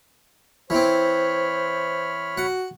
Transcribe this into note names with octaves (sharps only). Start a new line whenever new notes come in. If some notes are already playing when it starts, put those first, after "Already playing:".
E3 C4 C5 C#5 B5 F6
F#4 F#5